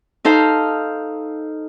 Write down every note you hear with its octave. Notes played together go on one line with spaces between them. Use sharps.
D#4 A4 C5 F5